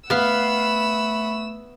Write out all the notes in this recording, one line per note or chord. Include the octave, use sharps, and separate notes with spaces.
A3 B3 F5 F#5 B5 E6